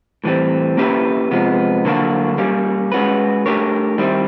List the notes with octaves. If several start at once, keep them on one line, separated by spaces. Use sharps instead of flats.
A2 E3 G3 C4
A#3 C#4 E4 G4 B4
C3 F3 G#3 B3
D3 F#3 A#3 D4 F#4
G3 A#3 C#4
G#3 C#4 F#4 B4
A3 D4 G4 A#4 C#5
D#3 G3 C4 E4